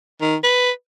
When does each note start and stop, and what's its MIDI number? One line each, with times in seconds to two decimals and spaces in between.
0.21 0.36 51
0.43 0.71 71